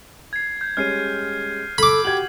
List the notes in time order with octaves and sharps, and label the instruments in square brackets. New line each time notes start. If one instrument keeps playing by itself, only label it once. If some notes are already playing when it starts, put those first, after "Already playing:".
[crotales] G#6 C7
G6
[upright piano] G3 G#3 C#4 [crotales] F6 C7 D#7
[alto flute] A4 [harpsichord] B5 D6
[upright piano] F#4 G#6 [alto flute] G4 [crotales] F#7